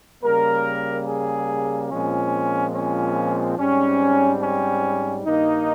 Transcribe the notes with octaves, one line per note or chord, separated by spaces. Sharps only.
C#3 G3 A#3 A#4
G#4
A#2 F3 G#3 C4 C#4
C#4
G#2 G3 C4 C#4
C#4
G2 D#3 A#3 D#4